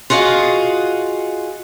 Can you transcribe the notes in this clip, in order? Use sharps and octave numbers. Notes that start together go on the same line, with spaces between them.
F4 F#4 G#4 D#5 F5